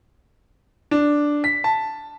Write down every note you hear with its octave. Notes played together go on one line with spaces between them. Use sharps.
D4
B6
A5